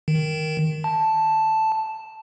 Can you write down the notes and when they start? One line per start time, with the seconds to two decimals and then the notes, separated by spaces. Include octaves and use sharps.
0.08 D#3
0.84 A5